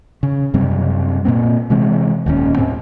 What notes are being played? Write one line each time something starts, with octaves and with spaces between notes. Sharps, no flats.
C#3
F#2 C3 G3 C4
A#2 A#3 C4
C3 E3 G#3 C4
D#1 D#2 D3 C#4
A2 C4